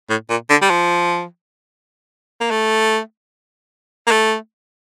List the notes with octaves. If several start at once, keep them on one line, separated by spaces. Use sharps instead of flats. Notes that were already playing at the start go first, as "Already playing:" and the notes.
A2
A#2
D3
G3
F3
A#3
A3
A#3
A3